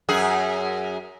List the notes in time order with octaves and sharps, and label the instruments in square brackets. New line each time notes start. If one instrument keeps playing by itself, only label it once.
[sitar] F#2 G#4